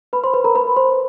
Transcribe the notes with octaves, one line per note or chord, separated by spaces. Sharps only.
B4 B5
C5 C6
B4 B5
A#4 A#5
B4 B5
C5 C6